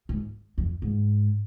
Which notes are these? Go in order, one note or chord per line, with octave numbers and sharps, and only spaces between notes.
G#2
F2
G#2